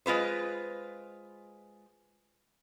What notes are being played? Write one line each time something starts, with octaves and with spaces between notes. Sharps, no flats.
G#3 F4 B4 C5